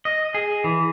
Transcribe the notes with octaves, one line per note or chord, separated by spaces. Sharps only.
D#5
G#4
E3